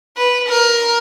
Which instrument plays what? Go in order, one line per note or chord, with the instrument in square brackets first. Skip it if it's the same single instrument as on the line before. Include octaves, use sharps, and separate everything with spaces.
[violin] B4
A#4